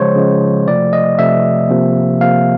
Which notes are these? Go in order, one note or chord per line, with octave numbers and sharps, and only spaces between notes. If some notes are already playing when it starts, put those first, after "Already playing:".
Already playing: C#3 F3 G#3 C5 C#5
C#3 F3 G#3
C3 F3 A3 D5
D#5
C3 F3 A3 E5
C3 F3 A#3
C3 F3 A#3 F5